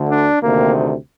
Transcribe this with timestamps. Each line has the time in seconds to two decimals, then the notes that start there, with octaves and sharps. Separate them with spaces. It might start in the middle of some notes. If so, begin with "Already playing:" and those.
Already playing: D2 D3
0.10 D4
0.42 D2 C3 D#3 A#3